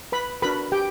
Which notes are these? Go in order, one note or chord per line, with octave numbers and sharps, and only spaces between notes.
B4 B5
D4 F#4 A#4 B4 B5
G4 G5